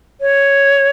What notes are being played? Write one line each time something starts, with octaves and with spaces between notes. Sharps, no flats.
C#5